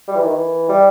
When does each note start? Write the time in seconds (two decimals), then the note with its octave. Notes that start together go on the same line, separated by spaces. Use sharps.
0.08 G3
0.16 E3
0.24 D#3
0.32 E3
0.69 G3